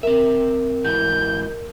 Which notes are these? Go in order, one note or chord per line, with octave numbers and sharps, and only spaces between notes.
C4 A#4 E5
G#2 E3 F#4 G6